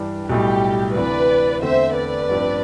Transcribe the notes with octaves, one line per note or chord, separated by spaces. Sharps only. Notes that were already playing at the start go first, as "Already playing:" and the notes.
Already playing: G2 E3 G3 D4
B1 A2 G3 G4
D2 C3 E3 B4 D5
E2 D3 A3 C4 C5 E5
B4 D5
A1 G2 F3 C4